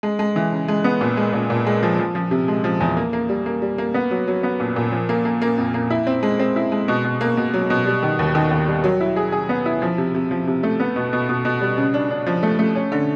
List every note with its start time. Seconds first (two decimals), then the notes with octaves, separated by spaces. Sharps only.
0.03 G#3
0.19 G#3
0.36 E3
0.52 C#3
0.68 G#3
0.84 B3
1.01 A#2
1.17 G#3
1.33 A#2
1.50 A#2
1.67 G#3
1.83 F3
1.99 F3
2.15 F3
2.31 C3
2.48 G#3
2.64 F3
2.80 E2
2.97 A#3
3.13 A#3
3.29 G3
3.46 A#3
3.62 G3
3.78 A#3
3.94 B3
4.11 F#3
4.27 F#3
4.43 B3
4.60 A#2
4.76 A#2
4.92 F3
5.09 A#3
5.25 A#3
5.42 A#3
5.58 F2
5.74 A#3
5.90 E4
6.07 C4
6.23 G#3
6.39 C4
6.56 E4
6.72 G#3
6.88 B2
7.04 B2
7.21 A#3
7.37 B2
7.54 F#3
7.70 B2
7.86 G3
8.03 D#3
8.19 D#2
8.35 D#3
8.51 D#2
8.68 G3
8.84 F#3
9.01 E4
9.16 G#4
9.32 G#4
9.49 B3
9.66 E4
9.82 F3
9.98 C3
10.15 C3
10.31 F3
10.47 C3
10.63 A3
10.80 B3
10.96 B2
11.13 B2
11.29 B2
11.45 B2
11.61 G3
11.78 C#3
11.94 D4
12.10 D4
12.26 F3
12.43 A3
12.59 A3
12.75 C#4
12.92 D3